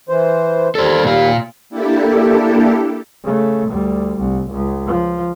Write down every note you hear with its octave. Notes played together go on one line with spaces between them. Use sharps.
E3 C5
D#2 G3 A4 C5
A#2 F5
A#3 D4 E4 G4 A4
C#3 A3
D2 G3
C2
C#2
F3